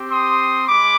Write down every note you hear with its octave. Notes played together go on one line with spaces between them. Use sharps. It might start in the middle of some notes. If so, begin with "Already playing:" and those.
Already playing: C4 G4
C6 D#6
G#3 B5 D6